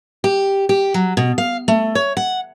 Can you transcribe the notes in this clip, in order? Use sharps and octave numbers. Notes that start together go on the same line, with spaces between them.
G4
G4
F#3
B2
F5
A3
C#5
F#5